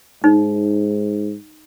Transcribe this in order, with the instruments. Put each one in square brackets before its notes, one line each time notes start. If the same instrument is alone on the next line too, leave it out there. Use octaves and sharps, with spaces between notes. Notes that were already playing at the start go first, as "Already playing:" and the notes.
[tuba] G#2 [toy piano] D#4